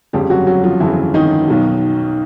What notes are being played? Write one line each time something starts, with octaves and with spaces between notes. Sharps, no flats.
G1 F2 C#3 F3 G3 G4
F#3 F#4
F#3 F#4
F3 F4
G1 F2 C#3 E3 F3 E4
D#3 D#4
B1 B2 F#3